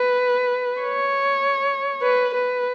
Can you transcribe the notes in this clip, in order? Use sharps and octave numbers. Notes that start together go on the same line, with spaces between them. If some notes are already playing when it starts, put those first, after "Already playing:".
Already playing: B4
C#5
B4
B4